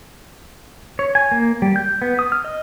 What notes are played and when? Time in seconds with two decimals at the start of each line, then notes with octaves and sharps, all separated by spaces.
0.99 C#5
1.15 G#5
1.32 A#3
1.62 G3
1.76 G6
2.02 B3
2.19 D#6
2.32 F6
2.45 D#5